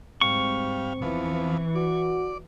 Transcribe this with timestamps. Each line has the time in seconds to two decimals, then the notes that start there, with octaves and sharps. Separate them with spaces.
0.21 G#2 G3 C4 F5 C#6
1.02 E2 E3 F3 B3
1.75 F#4 D5